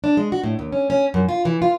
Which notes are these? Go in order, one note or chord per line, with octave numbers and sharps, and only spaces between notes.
D4
G#3
F#4
A2
D#2
C#4
C#4
F#2
F4
E3
F4